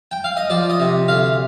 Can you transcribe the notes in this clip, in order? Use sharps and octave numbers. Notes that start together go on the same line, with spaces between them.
G5
F5
D#5
F3 D5
D#5
C3
D2 F5